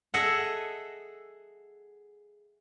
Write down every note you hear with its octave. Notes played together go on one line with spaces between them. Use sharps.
G#4 A4 D#5 E5 F#5